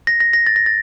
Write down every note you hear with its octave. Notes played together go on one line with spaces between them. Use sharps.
A#6
A#6
A#6
A6
A#6
A6